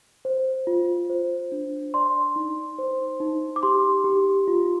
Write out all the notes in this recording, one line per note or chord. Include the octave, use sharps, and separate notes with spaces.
C5
F4
C5
D4
D5 C6
D#4
C5
D#4
D6
G4 C6
G4
F4